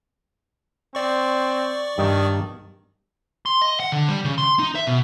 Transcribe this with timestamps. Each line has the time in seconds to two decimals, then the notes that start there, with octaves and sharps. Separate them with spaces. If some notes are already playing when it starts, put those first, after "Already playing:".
0.95 C4 D5 C#6
1.98 G2 D#3 G4 D#5
3.46 C6
3.62 D#5
3.80 F#5
3.92 D3
4.09 G3
4.25 C#3
4.38 C6
4.59 D#4
4.75 E5
4.87 B2